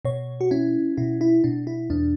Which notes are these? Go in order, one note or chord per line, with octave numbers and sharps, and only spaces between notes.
B2 C#5
F#4
C#4 E4
B2 E4
E4
B2 D4
E4
E2 D4